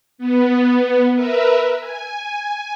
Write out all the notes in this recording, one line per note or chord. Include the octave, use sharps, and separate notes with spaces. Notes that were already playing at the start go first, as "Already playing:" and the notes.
B3
A#4 B4 E5
G#5